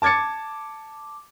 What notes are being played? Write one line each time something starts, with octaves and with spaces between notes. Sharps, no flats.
A5 D6 G#6 A6 C#7